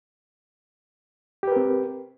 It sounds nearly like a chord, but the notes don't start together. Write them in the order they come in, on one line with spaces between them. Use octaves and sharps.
G4 B4 A#4 C4